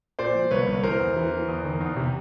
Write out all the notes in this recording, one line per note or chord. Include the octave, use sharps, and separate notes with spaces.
A#2 C5 D5
F3
C2 B4 C#5
C2
E3 A#4 C5
E2
E3
E3
E2
D#3
E2
C3